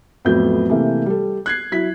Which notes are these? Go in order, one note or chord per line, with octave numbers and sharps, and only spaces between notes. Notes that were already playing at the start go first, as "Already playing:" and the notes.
F2 A2 F#3 B3 G6
C3 E3 A3 A#3
G3 A4
F#6 G#6 C7
F#3 E4 B6